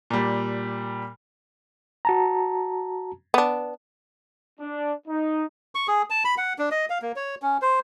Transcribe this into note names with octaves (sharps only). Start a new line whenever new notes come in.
A#2 G3
F#4 A5 A#5
B3 D4
D4
D#4
C#6
G#4
A5
B5
F#5
D4
D#5
F5
A#3
C#5
C#4
C5